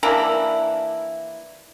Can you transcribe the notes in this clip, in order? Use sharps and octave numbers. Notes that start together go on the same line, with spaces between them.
E3 A#3 D4 E4